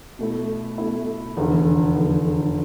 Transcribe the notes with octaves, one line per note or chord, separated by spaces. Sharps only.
B2 A3 E4
B2 A3 E4
F1 E2 D3
F1 E2 D3